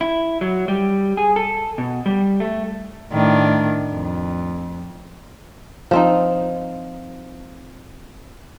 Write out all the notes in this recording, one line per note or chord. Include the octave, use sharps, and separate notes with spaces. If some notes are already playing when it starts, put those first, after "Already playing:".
E4
F#3
G3
G#4
A4
B2
G3
A3
A2 D#3 D4
F2
F3 C4 D#4